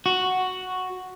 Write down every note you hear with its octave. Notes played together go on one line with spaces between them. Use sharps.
F#4